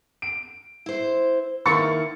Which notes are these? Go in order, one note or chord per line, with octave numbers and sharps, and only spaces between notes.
D7
E4 C5
D#3 A#3 E4 C#6 A6 C#7